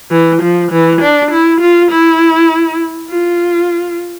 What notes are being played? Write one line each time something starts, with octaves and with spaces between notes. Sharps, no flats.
E3
F3
E3
D4
E4
F4
E4
F4